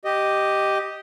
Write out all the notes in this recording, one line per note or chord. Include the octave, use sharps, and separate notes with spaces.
G4 D#5